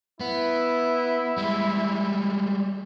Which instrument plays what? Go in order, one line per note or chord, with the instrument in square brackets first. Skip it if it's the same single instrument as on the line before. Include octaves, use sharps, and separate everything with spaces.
[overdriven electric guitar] B3 [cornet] E4
[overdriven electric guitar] G3 G#3